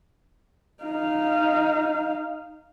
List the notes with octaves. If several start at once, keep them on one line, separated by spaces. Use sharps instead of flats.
D#4 F5